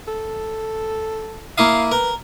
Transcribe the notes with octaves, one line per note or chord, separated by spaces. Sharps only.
A4
A#3 E4 F5 D#6
A#4 B4